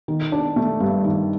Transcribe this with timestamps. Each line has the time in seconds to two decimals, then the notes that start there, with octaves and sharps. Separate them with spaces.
0.08 D#3
0.32 D4
0.56 A3
0.80 G2
1.04 D#3